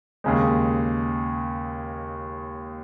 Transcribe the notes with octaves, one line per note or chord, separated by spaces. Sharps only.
D#2 C#3 G#3